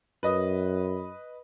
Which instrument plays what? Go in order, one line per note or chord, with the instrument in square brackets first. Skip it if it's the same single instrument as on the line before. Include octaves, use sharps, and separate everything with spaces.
[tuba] F#2 [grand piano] B4 D#5 D#6